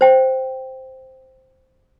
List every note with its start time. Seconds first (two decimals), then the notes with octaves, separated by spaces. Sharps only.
0.01 C5 G5